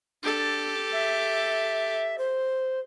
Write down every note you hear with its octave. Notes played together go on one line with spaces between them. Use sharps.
D4 G4 A4
E5
C5